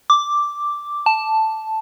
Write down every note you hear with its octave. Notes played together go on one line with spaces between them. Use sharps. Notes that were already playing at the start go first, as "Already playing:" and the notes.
D6
A5